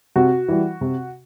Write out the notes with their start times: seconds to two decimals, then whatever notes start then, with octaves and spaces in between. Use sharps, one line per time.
0.16 C3 F#4
0.48 E3 G3
0.81 C3